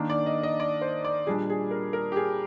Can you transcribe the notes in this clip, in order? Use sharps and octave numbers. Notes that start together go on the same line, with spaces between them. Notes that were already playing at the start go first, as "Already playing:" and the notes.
Already playing: D#3 A#3 D4
D5
D#5
D#5
D5
C5
D5
A#2 G3 D4 G#4
G#4
A#4
A#4
G4
G#4